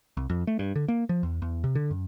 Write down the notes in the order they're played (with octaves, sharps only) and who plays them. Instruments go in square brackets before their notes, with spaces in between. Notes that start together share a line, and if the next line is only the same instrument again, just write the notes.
[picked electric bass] C2
F2
A3
G2
D3
A#3
F3
E2
E2
C3
D3
F#2